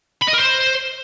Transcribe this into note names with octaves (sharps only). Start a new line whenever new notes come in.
B5
D#5
A#4
C5